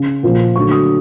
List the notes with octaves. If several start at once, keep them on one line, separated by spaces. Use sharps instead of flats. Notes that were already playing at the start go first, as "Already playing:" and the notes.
Already playing: C#3
A#2 F3 A#3
D3 F#3 A3 C#6
D#6